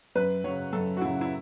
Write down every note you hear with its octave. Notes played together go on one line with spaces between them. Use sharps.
F#2 B4
C#3 F#3 C#5
F#2 A4
F#4
C#3 F#3 E4
E4